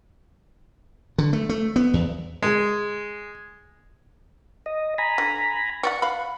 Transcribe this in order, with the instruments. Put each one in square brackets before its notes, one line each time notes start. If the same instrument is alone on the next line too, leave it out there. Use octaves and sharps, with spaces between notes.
[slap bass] D3
A3
A3
B3
E2
[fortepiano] G#3
[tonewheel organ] D#5
G#5 A#5 B5
[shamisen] D3
[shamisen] C4 D5 F#5 [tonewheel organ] C#6
[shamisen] F5 B5 [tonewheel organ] F#5